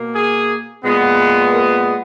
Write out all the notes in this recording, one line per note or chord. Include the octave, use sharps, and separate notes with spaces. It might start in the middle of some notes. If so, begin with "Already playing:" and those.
Already playing: B2 A#3
G#4
A#2 G#3 B3
A#4